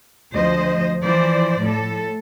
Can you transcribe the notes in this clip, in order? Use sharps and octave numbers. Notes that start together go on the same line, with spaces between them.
D2 F3 C5 D#5
E3 F3 C5 D5
A2 A4